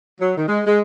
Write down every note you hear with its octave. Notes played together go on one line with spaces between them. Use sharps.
F#3
D#3
G#3
G#3